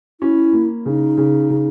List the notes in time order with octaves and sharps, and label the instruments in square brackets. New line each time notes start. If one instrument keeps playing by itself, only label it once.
[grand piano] C#4 [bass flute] E4
[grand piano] A#3
[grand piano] C#3 [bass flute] D#4
[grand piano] C#3
C#3